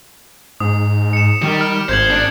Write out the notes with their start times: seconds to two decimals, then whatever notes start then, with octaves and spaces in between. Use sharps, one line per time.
0.60 G#2 D#6
1.13 C#7 E7
1.42 D#3 G3
1.61 F6
1.89 G#1 C5 G6 G#6 F#7
2.10 D4